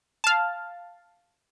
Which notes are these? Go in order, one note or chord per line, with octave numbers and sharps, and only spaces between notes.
F5 A5